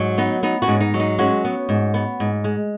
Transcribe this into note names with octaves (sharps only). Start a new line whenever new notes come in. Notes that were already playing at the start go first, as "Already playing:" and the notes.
Already playing: G#2 F#3
B3 D#4
B3 D#4
C#4 F#4
G#2
D#4
F#3
D#4
G#3 C#4 F#4
B3
G#2
B3
G#2
G#3